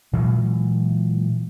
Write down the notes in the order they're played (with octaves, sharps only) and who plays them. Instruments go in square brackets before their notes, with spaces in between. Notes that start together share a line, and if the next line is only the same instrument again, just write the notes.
[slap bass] A#2 E3 F#3 G#3